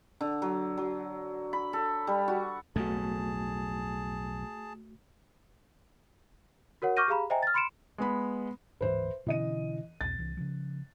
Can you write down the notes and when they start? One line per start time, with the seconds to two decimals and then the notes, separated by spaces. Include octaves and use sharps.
0.21 D3
0.42 F#3
0.77 F#3
1.53 B5
1.73 A4
2.07 G3
2.28 F#4
2.76 B1 F2 A2 A3 F#4 G#4 A5
6.82 F#4 A#4 C#5 F#5
6.97 C#6 D6 F6 G6 A#6 D#7
7.08 G4 G#4 F5 A#5 B5
7.30 C5 D#5 E5 G5 G#5 A#5
7.43 F6 A6
7.54 B5 C6 C#7 D7 E7
7.98 G#3 B3 B5
8.81 D1 G#2 E3 B4 C5 E5
9.26 B2 D3 E3 C#4 D#5 D#7
10.01 B1 E2 B2 A6
10.19 C2 E3
10.37 C#3 F3